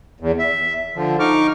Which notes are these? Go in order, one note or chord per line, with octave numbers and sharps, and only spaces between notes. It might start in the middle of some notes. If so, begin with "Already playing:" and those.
E2
E5
D3 F3
D#4 C#6 D6 F6